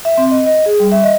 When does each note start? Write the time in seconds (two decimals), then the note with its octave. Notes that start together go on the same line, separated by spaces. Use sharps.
0.05 E5
0.18 C4
0.31 D#5
0.46 D#5
0.66 G#4
0.80 G3
0.92 E5
1.04 D#5